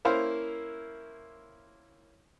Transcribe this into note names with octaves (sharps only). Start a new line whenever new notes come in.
A#3 C#4 E4 C5 F5